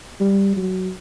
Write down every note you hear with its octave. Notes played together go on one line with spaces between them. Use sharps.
G3
F#3